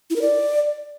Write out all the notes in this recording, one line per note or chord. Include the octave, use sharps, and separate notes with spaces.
E4
A#4
D5